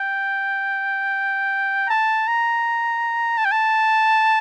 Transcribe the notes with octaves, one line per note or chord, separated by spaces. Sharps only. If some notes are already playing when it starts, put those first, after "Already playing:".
Already playing: G5
A#5
A5
A#5
A5
G5
A5